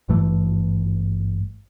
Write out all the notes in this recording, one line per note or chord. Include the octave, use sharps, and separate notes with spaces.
G#1 G2 E3 A3